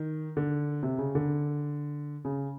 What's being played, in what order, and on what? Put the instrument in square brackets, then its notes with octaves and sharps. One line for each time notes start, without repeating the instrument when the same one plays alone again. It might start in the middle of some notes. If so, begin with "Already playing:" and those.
Already playing: [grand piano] D#3
D3
C3
C#3
D3
C#3